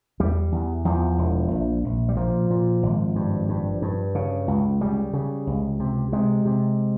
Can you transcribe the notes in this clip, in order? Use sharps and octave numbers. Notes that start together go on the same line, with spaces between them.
E2 G3
E2
E2 F3
E1
A#1
A#1
G3
A#2 F3
A#2
G#1
G2
G2
G2
C#3
C#2
C#3 G3
C#3
C#2
C3
C3 G#3
C3